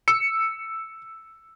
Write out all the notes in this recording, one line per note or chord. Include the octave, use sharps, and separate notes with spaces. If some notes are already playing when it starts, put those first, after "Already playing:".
E6 C#7